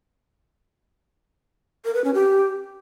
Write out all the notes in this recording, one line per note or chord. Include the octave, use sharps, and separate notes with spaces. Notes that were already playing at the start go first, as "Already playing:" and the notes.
A#4
B4
C#4
G4